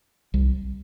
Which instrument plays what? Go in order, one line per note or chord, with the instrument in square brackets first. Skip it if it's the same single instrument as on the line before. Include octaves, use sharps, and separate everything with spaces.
[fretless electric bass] C2